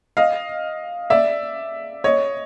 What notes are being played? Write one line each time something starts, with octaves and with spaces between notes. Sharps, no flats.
D#5 F5
D5 E5
C#5 D#5